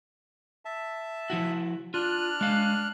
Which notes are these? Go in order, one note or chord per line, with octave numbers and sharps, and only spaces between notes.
E5 A5
F3 E4 F#4
D4 F4 F6 F#6
G#3 F5